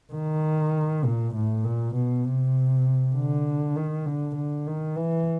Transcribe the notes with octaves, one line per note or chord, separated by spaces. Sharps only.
D#3
A#2
A2
A#2
B2
C3
D3
D#3
D3
D3
D#3
E3